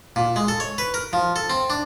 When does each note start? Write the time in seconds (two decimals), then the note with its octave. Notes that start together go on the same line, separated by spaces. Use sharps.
0.16 A#2
0.36 G#3
0.48 A4
0.60 C#5
0.78 B4
0.94 A#4
1.13 F3
1.36 A4
1.50 C4
1.70 D4